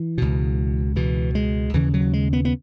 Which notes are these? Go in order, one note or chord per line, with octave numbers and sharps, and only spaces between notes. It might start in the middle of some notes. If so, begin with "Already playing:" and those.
Already playing: E3
C#2 B2
C#2 B2 E3
G#3
D#2 C#3 E3
F#3
G#3
B3
B3